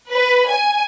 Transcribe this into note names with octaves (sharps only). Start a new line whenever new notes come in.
B4
G#5